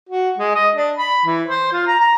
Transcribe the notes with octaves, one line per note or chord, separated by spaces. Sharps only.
F#4
G#3
D#5
D4
B5
E3
C5
F4
A#5
A#5